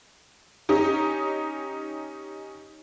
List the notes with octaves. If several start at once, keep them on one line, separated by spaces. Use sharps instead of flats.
C#4 D#4 G4